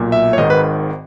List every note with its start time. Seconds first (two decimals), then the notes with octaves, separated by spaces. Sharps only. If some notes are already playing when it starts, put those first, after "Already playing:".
Already playing: B1 A#2
0.12 E5
0.33 C#5
0.38 G#1 G#2 D#3 D#5
0.50 B4